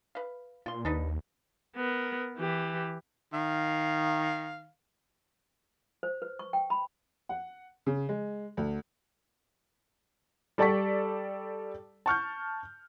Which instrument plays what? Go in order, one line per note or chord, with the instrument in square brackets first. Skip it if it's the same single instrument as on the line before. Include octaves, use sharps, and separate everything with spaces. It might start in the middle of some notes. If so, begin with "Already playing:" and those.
[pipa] B4 F5
[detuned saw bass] A#2 [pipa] F4 C6
[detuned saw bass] D#2 [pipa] D4 D#4 B4
[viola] B3 A#4
E3 G4
[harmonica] D#3 F5
[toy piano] C5
B4
C#6
G5
B5
[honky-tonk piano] F#5
C#3
G#3
D2
[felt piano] G3 A4 D5 A5 C#6 B6
A5 C#6 F6 G6